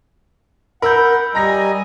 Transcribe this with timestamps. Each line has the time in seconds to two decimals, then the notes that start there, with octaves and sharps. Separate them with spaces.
0.82 A#4 F#5 B5 E6 G6
1.35 G3 D#5 G#5 A#5 A#6